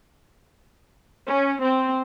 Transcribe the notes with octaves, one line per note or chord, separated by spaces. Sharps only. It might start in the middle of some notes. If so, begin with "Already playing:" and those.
C#4
C4